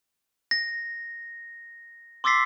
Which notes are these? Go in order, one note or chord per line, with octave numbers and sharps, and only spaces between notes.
A#6
C6 D6 E6 A6 B6 C7